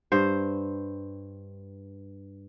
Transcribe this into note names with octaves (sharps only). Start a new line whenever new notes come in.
G2 C5